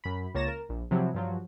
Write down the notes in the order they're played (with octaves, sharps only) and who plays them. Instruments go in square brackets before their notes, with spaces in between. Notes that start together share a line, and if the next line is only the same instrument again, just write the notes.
[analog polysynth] F#2 B5
C#2 A#3 C#5 A6 A#6 E7
A#4
A#1
C3 F3 F#3 E4
G2 F3 F#3